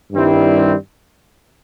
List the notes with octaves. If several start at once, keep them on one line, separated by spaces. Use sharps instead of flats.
G2 D#3 G3 C4 E4